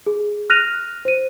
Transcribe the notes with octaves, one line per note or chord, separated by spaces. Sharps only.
G#4
F6 F#6 A#6 D#7 F7
C5 D#7